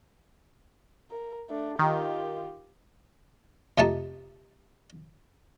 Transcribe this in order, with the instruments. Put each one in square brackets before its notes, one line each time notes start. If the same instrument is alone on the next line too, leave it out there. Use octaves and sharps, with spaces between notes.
[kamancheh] A#4
A3 D4
[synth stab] D#3 [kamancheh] F4 G4
[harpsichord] F2 C3 A3 D#4 A5